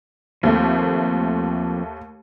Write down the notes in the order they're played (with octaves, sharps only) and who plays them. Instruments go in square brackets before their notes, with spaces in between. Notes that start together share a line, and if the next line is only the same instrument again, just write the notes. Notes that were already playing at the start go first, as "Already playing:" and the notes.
[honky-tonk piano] D#2 A3 [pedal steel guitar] F3 A#3 C4